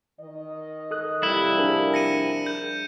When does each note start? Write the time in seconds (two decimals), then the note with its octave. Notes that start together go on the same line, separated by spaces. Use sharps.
0.21 D#3 D#5
0.91 A4 D#6 F#6
1.23 C3 F3 G3 E4
1.58 D4 G#4 A#4
1.94 A#6 C#7 D#7
2.46 G6